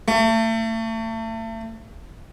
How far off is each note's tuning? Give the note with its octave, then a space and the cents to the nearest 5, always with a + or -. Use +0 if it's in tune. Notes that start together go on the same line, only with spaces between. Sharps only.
A3 +35